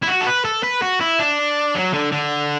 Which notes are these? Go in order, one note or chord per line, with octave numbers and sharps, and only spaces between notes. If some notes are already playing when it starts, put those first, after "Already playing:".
E4
F#4
A4
B4
A4
B4
F#4
E4
D4
F#3
D3
D3